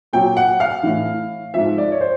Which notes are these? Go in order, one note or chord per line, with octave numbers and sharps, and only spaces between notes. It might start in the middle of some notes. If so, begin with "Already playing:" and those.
A#2 F#3 G5
F#5
F5
A2 E3
G#2 F3 E5
D5
C#5
C5